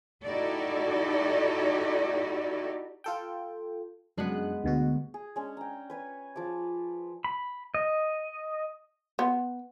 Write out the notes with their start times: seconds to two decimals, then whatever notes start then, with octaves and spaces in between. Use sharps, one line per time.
0.23 D#4 E4 F#4 G4 A4 D5
3.04 F4 A4 G5
4.18 F#2 G#3 B3 D4 F#6
4.64 D2 B2 F#4
5.14 G#4
5.36 G#3 C#4 D4
5.57 G5 A#5
5.90 B4 C#5 G#5
6.36 F3 G#4 D6
7.24 B5
7.75 D#5
9.19 B3